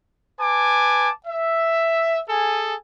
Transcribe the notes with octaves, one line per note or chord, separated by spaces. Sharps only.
B4 G#5 A5 D6
E5
G#4 A4 G#5